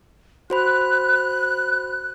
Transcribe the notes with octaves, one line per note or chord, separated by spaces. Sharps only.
F#4 C5 B5 F#6